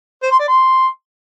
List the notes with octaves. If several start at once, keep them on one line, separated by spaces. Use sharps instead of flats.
C5
C6
D5
C6